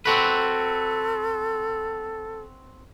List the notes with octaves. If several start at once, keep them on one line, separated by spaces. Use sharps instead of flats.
C4 F#4 A4 B4